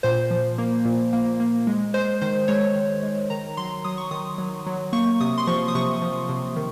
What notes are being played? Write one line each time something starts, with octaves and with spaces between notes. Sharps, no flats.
A#2 C5
F3
A#3
A#2
A#3
A#3
G#3
G#3 C5
D#3 C5
G#3 C#5
D#3
G#3
D#3 A#5
F#3 C6
F#3 D#6
C#6
D#3 D#6
F#3
F#3
A#3 C#6
C3 D#6
C6
F3 C#6
D#6
C3 C#6
F3
C3
D#3